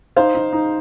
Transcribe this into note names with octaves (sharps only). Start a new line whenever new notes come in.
D#4 C5 F5
D#4
D#4